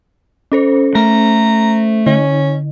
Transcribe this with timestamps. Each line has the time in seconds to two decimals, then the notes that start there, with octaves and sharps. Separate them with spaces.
0.52 C#4 A4 C5
0.95 A3 A#5
2.06 D3 C#4